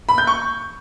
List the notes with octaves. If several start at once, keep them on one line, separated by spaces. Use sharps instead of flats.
B5
G6
C#6